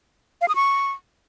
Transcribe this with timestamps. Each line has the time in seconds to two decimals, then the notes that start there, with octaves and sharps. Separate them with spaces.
0.41 F5
0.48 D#6
0.55 C#6